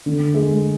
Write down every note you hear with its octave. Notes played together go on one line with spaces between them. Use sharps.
D3
G#3